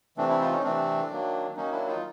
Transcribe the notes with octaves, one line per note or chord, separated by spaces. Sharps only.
C3 E3 A3 C4 D4
D4 E4
D#4 F4
C#4 D#4
C3 E3 A3 C4 D4
D#3 F#3 A#3
D#3 F#3 A#3 C#4 D#4
D4 E4
D#4 F4